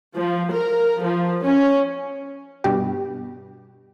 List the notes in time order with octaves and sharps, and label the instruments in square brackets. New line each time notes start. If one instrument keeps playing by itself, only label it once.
[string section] F3
A#4
F3
C#4
[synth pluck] G2 B2 G4